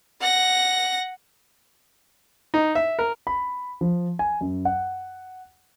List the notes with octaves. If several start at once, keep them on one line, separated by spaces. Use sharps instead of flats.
F#5 A#6
D#4
E5
A#4
B5
F3
G#5
F#2
F#5